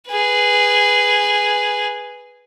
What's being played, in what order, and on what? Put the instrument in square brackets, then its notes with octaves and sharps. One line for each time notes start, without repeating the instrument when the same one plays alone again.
[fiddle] G#4 B4